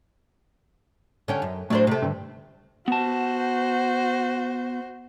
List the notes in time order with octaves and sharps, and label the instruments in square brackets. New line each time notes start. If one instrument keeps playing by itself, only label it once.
[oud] D3 C#4 G4
F#2
[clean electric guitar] A2 [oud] F#3 D4 C5
[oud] C3 A3
[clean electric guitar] G2 D3
[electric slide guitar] B3 A5 [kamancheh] F#4 C5